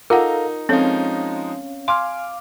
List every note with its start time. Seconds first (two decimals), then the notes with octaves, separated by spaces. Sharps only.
0.10 D#4 F4 A4 A#4 F5 F#5 A#5
0.69 F3 G#3 C4 C#4 D#4 A4 C#5 F5
1.88 F5 G#5 C6 D6 F6